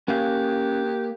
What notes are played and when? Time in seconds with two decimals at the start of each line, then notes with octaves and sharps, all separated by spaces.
0.08 A#3 C#4 G4 F5